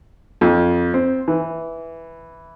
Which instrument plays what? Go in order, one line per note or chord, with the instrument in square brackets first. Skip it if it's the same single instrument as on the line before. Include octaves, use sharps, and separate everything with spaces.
[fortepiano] F2
C4
E3